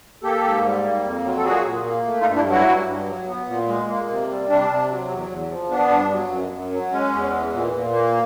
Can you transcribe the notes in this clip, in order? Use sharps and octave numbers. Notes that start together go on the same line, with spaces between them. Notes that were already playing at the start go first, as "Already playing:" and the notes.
A#3 G4 A4
G#2
G3
A#3
F2
F#3
A4
A#2 F#4 G#4
A#2
A#3
A3
D#4 F4
G2
D4 E4
F#3 E4 F#4
G2
G2
F#3
B3
A#2
G#3
A#3
C3
G3
C3 D4
C3
F#3
E2
E2
F3
B3 D4
G2
F#3
F#2
F#2
F#3
G#3 C#4
E2
E3
A#2
A#2
A#3